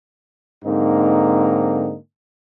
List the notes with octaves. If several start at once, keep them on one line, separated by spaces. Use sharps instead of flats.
G#2 D3 A#3 C4 D#4